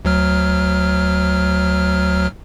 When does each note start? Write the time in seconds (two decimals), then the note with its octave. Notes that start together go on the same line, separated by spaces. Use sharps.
0.05 D2 F#3 F6